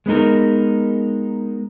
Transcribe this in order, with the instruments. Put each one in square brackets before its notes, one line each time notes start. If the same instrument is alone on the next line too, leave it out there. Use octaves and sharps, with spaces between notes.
[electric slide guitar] G#3 B3 D#4 A#4